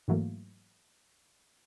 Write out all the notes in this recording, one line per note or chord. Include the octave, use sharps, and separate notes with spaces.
G#2 E3 F#3 A3 A#3